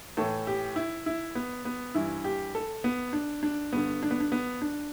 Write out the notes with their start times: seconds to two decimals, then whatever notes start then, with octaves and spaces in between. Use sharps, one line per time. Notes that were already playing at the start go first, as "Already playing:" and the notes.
0.17 A2 E3 A4
0.47 G4
0.76 E4
1.06 E4
1.35 B3
1.65 B3
1.95 G2 E3 E4
2.24 G4
2.55 A4
2.84 B3
3.13 D4
3.43 D4
3.73 G2 D3 B3
4.03 D4
4.11 B3
4.20 D4
4.32 B3
4.62 D4